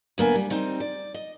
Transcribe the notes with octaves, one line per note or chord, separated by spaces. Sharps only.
D2 A#3 B3 G#5
G3
G3 C4 D#4
D5
D#5